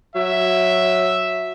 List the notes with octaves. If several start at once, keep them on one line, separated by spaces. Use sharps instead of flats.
F#3 E5